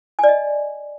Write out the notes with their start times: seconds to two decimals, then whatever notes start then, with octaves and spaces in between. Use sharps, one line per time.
0.19 G#5
0.24 D5
0.28 D#5